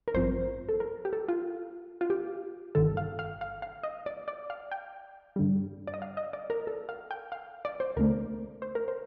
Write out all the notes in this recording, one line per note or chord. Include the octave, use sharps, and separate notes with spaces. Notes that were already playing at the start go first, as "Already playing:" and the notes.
A#4
A1 G2 F3 C4 C5
A4
A#4
G4
A4
F4
F4
G4
G1 G2 D#3 A4
F5
F5
F5
F5
D#5
D5
D5
F5
G5
G2 D3 G3
D5
D#5
F5
D#5
D5
A#4
A4
F5
G5
F5
D5
C5
D2 D3 A3 A#4
C5
A#4
C5